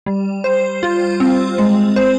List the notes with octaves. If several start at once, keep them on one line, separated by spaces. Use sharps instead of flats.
G3
C5
F4
C4
G#3
C5